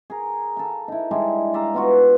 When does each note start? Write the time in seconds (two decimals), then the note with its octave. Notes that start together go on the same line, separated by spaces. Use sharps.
0.10 G#4 A#4
0.57 A4 F5
0.88 D#4 E4
1.11 G3 G#3 D4 E4
1.54 D5 E5 F5 A#5
1.74 B3 F4 F#4